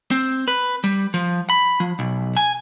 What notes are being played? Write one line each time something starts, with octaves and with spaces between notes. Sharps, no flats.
C4
B4
G3
F3
B5
F3
B1
G#5